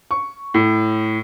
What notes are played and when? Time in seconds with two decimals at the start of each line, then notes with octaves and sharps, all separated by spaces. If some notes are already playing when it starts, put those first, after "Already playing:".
0.11 C#6
0.54 A2